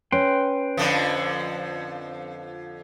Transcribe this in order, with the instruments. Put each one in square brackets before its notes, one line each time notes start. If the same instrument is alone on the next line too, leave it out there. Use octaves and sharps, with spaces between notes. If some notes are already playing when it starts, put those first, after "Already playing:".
[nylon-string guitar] C#4 [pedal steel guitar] B4 G5 C6
[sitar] F2 D3 F3